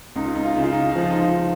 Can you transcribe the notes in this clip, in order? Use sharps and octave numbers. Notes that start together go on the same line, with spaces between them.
C#2 D#4
F4
D#4
F4
C#3 D#4
F4
D#4
F4
F3 D#4
F4
D#4
F4
D#4